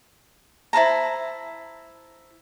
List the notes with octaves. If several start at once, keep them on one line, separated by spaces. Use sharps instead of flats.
E4 C5 A5 A#5